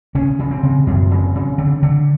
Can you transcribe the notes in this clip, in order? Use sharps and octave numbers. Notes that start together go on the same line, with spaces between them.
C#3 C#4
C#3
C4
C#3
F#2
C#3
C#3
D3
D3